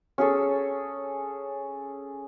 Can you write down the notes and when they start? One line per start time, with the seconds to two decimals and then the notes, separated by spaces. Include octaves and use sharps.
0.18 C#4 G#4 A4